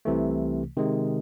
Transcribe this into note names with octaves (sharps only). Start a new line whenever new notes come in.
C2 C3 E3 A3
C3 D#3 G#3